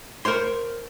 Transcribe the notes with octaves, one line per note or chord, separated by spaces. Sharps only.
A#4 C5 C#5 C6